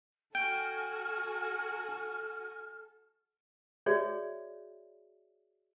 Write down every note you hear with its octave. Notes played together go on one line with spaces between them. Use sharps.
F#4 A4 G5 G#5 F6
F#4 G#4 C#5 D5 E5